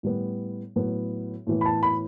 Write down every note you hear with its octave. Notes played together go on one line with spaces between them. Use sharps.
A2 G3 B3
A2 F#3 B3
A2 E3 B3
B5
A5
B5